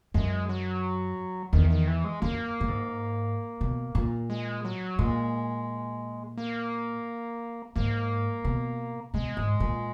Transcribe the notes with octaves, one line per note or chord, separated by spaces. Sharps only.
F#2 G#3
F#3
E2 D#3
D#3
E3
G#3
F#2 A#3
A#2
G#2
B2
A#2
G#3
F#3
A#2 G#3
A#3
G#2 A#3
B2
B2 G#3
G#2
A#2